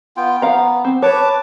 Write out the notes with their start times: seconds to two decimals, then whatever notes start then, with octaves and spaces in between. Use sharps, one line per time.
0.17 B3 F4 G5
0.42 B3 F5 A#5
0.85 C4
1.02 B4 C#5 A5 D6